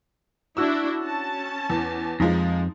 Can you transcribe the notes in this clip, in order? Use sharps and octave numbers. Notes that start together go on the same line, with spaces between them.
D4 E4 F#4 E6
C#4 A5
E2
F2 F3 G#3 D#4